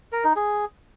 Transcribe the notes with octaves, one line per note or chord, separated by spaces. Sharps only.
A#4
D#4
G#4